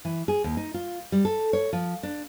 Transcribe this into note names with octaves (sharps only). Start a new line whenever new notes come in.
E3
G#4
D#2
D#4
F4
G3
A4
C#5
F3
D4